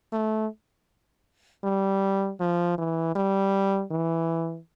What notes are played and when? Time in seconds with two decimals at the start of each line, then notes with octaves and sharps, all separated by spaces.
0.13 A3
1.64 G3
2.40 F3
2.78 E3
3.16 G3
3.91 E3